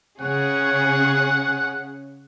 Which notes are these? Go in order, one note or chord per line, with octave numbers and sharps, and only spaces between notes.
C#3 G#4 C#5 F#5